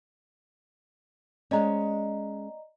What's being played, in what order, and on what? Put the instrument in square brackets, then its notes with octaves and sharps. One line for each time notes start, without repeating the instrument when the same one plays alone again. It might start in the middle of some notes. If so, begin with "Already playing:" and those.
[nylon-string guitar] G#3 C#4 [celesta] D5 D#5 A#5